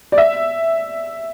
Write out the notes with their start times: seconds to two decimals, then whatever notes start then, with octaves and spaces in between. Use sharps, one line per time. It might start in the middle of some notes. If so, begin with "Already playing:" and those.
0.12 D5
0.18 E5